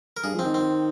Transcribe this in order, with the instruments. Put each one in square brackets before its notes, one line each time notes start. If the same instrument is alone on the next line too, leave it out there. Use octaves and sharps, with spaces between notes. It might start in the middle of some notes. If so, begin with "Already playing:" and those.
[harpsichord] A#4
[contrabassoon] G2 [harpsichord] G#4
[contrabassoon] F3
[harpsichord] C4
[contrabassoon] D#3
[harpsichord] C4